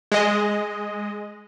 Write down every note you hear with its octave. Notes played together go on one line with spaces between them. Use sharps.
G#3 D#5